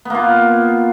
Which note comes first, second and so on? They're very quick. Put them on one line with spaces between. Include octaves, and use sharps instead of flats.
B3 A#3 F4